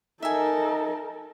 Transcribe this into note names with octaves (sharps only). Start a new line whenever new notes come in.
D#4 A4 A#4 E5 G#5